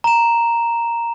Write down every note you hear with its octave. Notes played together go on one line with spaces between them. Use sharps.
A#5 E7